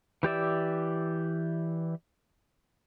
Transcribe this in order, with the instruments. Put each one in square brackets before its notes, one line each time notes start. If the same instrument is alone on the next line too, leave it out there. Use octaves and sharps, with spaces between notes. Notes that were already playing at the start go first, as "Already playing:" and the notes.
[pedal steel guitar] E3 G4 D5 E5